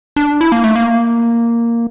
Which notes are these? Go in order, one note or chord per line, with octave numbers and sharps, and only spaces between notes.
D4
E4
A#3
A3
A#3